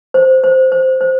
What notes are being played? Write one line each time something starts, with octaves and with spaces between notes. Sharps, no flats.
C5
C5
C5
C5